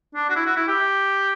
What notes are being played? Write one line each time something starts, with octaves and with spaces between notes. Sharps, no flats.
D4
F#4
E4
F#4
E4
G4